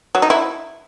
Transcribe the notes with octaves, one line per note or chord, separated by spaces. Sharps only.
F#3
D#4
E4